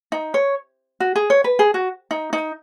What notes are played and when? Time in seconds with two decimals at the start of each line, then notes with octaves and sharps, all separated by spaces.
0.12 D#4
0.34 C#5
1.00 F#4
1.15 G#4
1.30 C#5
1.44 B4
1.59 G#4
1.74 F#4
2.11 D#4
2.33 D#4